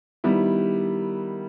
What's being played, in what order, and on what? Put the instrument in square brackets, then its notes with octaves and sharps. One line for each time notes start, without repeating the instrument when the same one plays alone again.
[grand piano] D#3 G3 B3 E4